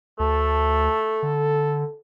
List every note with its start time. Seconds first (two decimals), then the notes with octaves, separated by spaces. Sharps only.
0.20 D2 A3 A4
1.23 D3